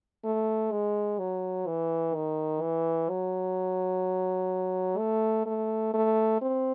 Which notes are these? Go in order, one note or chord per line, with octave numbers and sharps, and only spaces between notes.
A3
G#3
F#3
E3
D#3
E3
F#3
A3
A3
A3
C4